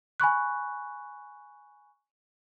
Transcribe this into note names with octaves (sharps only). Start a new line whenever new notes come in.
G#5 B5 C#6 F#6